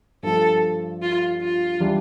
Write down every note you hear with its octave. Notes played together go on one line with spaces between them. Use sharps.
G2 F3 A3 A4
F4
F4
E3 G3 D4